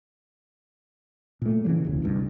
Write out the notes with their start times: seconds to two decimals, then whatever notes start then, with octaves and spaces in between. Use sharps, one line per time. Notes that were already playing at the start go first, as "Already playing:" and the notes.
1.42 A#2 A3
1.65 C#3 E3 G3
1.85 F1 D2
2.02 G1 C2 G2